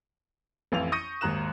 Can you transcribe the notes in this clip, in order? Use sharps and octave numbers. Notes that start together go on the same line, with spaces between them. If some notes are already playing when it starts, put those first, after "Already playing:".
A1 F2 E3 F5 F7
C#6 D#6 G6 A#6 C#7 D#7
G#1 D#2 A#5 F#6 E7